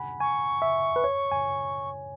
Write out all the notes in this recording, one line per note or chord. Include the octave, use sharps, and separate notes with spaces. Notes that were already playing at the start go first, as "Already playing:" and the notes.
Already playing: F#5 G#5 B5
G#5 C#6
E5
B4
C#5
G#5